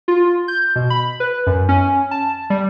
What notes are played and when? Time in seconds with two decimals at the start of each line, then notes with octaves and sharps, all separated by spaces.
0.08 F4
0.48 G6
0.76 B2
0.90 B5
1.20 B4
1.47 F#2
1.69 C#4
2.11 A5
2.50 G3